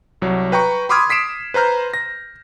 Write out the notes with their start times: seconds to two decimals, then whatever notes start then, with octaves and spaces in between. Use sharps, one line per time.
0.22 C2 F#3 C#5
0.52 B4 G5 A#5 C#6
0.89 B5 C6 D6 D#6 F6 G#6
1.10 D#6 B6 C7 D7 E7
1.54 B4 C5 A#5 F6 G6
1.94 A#6